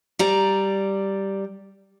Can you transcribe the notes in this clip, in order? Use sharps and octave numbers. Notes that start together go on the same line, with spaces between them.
G3 D5 A#5